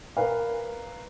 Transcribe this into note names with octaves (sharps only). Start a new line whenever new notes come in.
A#4 B4 F5